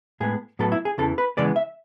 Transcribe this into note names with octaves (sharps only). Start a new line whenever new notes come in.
A2 G#3 B3 G#4
A2 F#3 B3 A4
E4
G#4
E2 C#3 E3 A4
B4
C#3 E3 G#3 B3 D5
E5